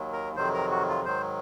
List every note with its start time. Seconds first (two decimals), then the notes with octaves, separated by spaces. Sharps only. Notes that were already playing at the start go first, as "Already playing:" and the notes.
Already playing: D#2 D#3 F#3
0.13 A#4
0.36 F2 C3 D#3 F#3 C5
0.54 A#4
0.71 F#4
0.89 F4
1.06 G#2 D#3 F#3 C5